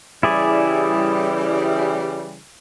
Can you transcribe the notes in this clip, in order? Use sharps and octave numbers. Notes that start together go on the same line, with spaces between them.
C#3 E3 G3 E4 G#4 D5